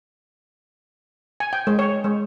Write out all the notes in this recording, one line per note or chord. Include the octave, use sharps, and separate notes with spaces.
G#5
G5
G#3
C#5
G#3